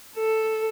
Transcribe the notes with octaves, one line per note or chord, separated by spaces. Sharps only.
A4